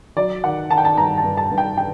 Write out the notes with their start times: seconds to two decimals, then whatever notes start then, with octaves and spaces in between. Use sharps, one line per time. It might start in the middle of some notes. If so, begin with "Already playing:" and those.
0.16 F#3 D5
0.44 D#3 F#5
0.70 D#3 A5
0.78 G5
0.85 A5
0.97 G2 A#5
1.18 A5
1.24 G2
1.37 A5
1.51 G2
1.58 G5
1.77 G5